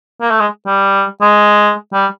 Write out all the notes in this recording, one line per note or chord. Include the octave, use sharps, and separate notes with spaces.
A#3
A3
G#3
G3
G#3
G3